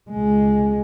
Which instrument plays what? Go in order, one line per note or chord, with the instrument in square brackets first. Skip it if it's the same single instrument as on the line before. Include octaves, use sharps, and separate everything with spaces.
[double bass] C#2 G#3